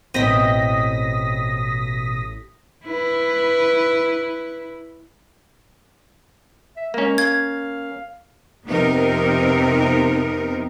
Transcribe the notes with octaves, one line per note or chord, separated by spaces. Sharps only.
A1 B2 C4 D#5 D#6 A#6 B6
E4 B4
E5
G#3 A#3 C#4
F5 G#6
F2 C3 B3 C4 D#4 A#4